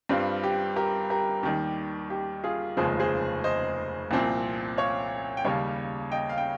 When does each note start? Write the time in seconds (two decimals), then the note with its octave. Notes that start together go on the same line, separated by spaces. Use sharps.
0.09 G2 G3 C4 F4
0.44 G4
0.76 G4 A#4
1.10 G4 A#4
1.43 D#2 D#3 G3 G4
2.10 G4
2.44 F4 G#4
2.77 F1 D#2 C#3 F3 G#3 G#4 C5
3.00 G#4 C5
3.44 C5 D#5
4.11 C2 A#2 F3 C4
4.78 C#5 F5
5.37 G5
5.45 D#2 C#3 G3 C#5 F5
6.12 D#5 G5
6.29 F5
6.38 G5